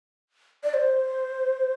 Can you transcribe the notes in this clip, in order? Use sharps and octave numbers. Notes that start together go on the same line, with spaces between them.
D5
C5